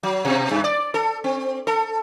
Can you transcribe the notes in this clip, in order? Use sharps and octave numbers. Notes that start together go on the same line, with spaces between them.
F#3
B2
G2
D5
A4
C4
A4